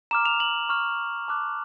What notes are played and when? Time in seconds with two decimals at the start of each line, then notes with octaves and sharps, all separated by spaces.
0.11 A#5 D6 F6 E7
0.25 F7
0.40 F#7
0.69 C#6 F6
1.28 A5 D6 F#6